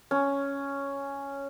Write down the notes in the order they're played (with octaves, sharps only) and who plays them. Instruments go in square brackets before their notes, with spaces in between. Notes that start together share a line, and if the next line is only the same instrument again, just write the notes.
[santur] C#4